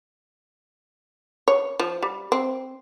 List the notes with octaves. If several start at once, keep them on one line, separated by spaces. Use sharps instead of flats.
C#5
F3
G3
C4